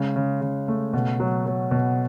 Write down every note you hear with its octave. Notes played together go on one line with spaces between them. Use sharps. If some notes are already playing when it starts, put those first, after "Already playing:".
Already playing: C#3 G#3
C#3
C#3
A3
B2
F#3
F#3
B2